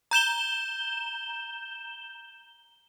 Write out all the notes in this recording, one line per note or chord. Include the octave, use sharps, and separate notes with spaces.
A#5 G6 E7 G7